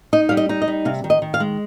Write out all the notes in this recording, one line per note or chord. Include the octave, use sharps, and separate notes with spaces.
D#4 D#5
G3 F5
D#5
D#4
D#5
G3
C3 F5
D#3
D#5
D#3
F5
G#3